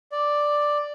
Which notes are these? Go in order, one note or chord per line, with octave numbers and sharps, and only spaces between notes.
D5